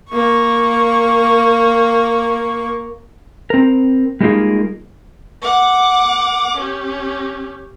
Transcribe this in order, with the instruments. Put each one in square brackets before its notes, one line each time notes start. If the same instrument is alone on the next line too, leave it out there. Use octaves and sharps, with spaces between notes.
[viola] A#3 C#6
[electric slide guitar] C4 A#4
G3 G#3 A#3 D#4 F4 G#4
[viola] F#5 D6
C#4 G4